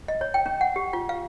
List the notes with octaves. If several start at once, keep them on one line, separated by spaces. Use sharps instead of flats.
D#5
C#5
G5
C#4
F#5
G4
F4
F5